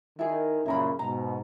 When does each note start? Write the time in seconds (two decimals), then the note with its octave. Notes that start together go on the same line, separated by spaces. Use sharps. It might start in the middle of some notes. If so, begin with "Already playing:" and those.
0.19 D#3 E4 G#4
0.66 F#2 A#2 C#3 E4 A#4 B5
0.99 G#2 B2 A#5